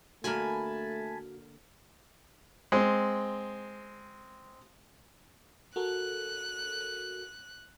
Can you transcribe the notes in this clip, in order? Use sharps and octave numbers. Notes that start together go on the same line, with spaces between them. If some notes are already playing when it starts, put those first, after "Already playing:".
D3 A3 A#3 F#4 G#5 A5 B5
G#3 C4
F#4 A4 A#4 F#6